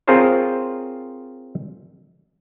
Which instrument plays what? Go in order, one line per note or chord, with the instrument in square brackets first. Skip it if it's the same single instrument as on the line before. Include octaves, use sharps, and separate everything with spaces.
[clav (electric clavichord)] C4 F4 G#4 A#4 C5 C#5